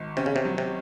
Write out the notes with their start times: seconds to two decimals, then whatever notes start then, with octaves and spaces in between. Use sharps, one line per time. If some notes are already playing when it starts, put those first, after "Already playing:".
Already playing: G#1
0.17 C3 C#4
0.26 C#3
0.36 C3
0.45 F#3
0.58 C3